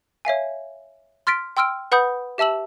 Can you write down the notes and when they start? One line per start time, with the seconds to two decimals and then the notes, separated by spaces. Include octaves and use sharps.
0.25 C#5 E5 F5 G#5
1.27 C6 F6 A6 B6 D7
1.57 G5 C6 E6 F6 D7
1.92 B4 F#5 B5 D#6 G6
2.38 G4 E5 A5 E6 F#7